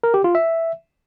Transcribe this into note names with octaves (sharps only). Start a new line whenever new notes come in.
A#4
G4
F4
E5